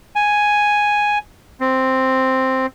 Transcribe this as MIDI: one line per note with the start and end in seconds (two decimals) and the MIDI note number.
0.16 1.18 80
1.61 2.66 60